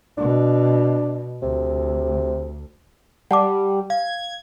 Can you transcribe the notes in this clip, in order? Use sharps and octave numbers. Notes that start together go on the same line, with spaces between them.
B2 D4
D2 C3
G3 F#5 A5 D6
F5 G#6